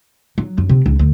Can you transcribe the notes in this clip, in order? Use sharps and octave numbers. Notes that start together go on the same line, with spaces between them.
F#3
F#2
C3
C#2
D2